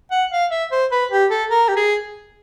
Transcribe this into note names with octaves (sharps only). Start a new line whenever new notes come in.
F#5
F5
E5
C5
B4
G4
A4
A#4
G4
G#4